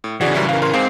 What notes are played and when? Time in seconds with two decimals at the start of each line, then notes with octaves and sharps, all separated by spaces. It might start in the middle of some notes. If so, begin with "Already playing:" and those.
0.04 A2
0.21 C#3 E3 F#4 G#4 D5
0.34 F#2 G3 E4
0.49 A#4 F5
0.62 A#4 C6
0.74 G#2 C4 G#4 F5